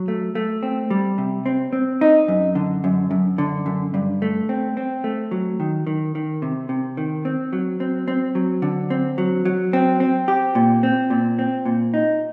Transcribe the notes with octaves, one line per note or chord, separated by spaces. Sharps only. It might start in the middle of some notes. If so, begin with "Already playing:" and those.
Already playing: F#3
A3
A3
C4
G3
C3
C4
C4
D#4
F#2
D3
F#2
F#2
D3
F#2
G2
A3
C4
C4
A3
F#3
D#3
D#3
D#3
C3
C3
D#3
C4
F#3
C4
C4
F#3
D3
C4
F#3
F#3
C4
C4
G4
A#2
C4
A#2
C4
A#2
D#4